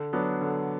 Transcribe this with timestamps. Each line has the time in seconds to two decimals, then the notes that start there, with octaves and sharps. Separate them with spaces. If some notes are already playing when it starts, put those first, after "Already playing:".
Already playing: D3
0.13 F#3 B3 D4
0.41 D3